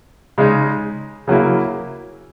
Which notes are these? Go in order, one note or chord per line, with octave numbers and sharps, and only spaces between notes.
C#3 G#3 D#4
C#3 F#3 A#3 E4